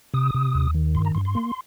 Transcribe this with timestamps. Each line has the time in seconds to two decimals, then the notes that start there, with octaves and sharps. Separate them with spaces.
0.14 C3 D#6
0.34 C3
0.55 D#2
0.75 D#3
0.95 G2 C6
1.05 A#5
1.15 G2 C6
1.25 C6
1.35 A#3